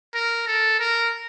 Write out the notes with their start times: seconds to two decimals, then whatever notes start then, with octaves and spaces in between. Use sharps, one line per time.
0.14 A#4
0.47 A4
0.80 A#4